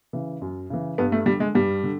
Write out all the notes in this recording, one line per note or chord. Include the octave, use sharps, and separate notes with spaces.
C#3 E3
F#2
C#3 E3
G2 B3
A3
D3 G3
G#3
G2 G3
D3